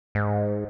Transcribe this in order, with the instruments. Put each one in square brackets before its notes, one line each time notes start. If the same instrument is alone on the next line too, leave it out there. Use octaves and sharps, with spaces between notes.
[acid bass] G#2